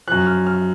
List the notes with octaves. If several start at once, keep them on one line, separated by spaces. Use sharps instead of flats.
F#2 F3 F#6
F6
F6